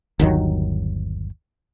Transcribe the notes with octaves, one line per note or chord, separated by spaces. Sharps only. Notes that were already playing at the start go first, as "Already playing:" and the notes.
G1 D#2 D#3 F#3